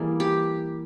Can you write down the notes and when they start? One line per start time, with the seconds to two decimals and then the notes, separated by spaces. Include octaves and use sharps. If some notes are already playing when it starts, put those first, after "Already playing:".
Already playing: E3 G3 A#3 G#4
0.20 G4